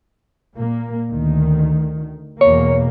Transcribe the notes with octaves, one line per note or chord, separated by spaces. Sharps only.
A#2 A#3
D2 D#3
E2 B2 A#3 C#5